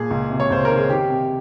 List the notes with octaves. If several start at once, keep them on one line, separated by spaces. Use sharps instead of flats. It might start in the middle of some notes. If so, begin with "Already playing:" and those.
Already playing: A#2 G#4
C#2
C3
C#5
C#2 C5
A#4
D#3
G#4
D#3 G4
C3